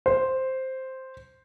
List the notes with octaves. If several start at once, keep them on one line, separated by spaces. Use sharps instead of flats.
C5